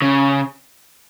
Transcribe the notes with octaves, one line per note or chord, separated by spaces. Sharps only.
C#3